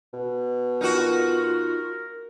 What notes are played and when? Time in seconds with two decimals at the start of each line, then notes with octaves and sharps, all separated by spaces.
0.13 B2
0.81 D#4 F4 F#4 A#4